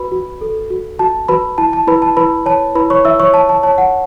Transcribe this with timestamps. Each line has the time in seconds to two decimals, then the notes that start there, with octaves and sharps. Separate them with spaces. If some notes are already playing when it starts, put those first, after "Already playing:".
Already playing: F#4 B4 B5
0.12 F#4
0.41 A4
0.70 F#4
0.99 F#4 A5
1.28 F#4 B4 B5
1.58 E4 A5
1.73 A5
1.87 E4 B4 B5
2.02 A5
2.17 E4 B4 B5
2.46 C#5 A5
2.75 E4 B4 B5
2.90 C#5 C#6
3.05 E4 E5 E6
3.20 C#5 C#6
3.34 C#5 A5
3.49 A5
3.63 C#5 A5
3.78 F#5